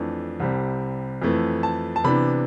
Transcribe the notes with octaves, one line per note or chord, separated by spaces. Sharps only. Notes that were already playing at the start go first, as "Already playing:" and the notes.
Already playing: F2 E3 A3 D4
C2 C3 G3 C4
F2 E3 A3
A5
A5
C3 E3 B3 D4 B5